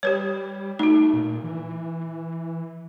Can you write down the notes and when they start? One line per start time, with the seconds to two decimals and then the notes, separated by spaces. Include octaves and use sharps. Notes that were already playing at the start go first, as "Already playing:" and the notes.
0.03 G3 G4 B4 C#5
0.79 A3 D#4 F#4
1.13 A#2
1.44 E3